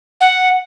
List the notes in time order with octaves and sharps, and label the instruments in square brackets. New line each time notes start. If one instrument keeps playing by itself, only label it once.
[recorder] F#5